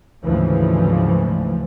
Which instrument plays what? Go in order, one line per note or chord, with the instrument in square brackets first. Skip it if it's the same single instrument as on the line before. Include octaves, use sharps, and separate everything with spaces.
[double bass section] D2 G#2 C#3 E3 F3